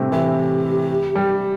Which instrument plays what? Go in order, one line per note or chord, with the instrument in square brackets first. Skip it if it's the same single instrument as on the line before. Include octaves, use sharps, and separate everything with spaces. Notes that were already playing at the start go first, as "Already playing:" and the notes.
Already playing: [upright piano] A2 C3 G3 A3 C4
[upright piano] E3 E4 [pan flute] G4
[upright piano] G3